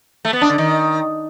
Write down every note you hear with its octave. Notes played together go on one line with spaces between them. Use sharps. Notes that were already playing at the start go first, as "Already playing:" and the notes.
A3
B3
D4
D3
D#3